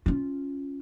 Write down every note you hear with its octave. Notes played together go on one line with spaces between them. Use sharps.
C#4 F4